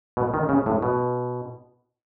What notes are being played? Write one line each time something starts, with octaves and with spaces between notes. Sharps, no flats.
B2
D#3
C#3
A2
B2